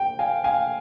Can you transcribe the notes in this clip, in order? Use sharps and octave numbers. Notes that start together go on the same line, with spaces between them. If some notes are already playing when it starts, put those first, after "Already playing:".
Already playing: G5
F5 G#5
F5 G#5